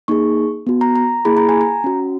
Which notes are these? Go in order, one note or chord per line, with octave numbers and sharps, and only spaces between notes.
A#3 D#4 G#4 C#6
B3 F#4
A#5
A#5
A#3 E4 G#4 B5
A#5
G#5
A#5
C#4 F#4